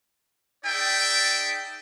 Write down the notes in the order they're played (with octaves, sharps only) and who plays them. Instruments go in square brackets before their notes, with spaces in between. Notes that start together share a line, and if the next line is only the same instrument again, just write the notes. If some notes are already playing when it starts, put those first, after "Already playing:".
[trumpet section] D#4 G#4 D5 E5 G5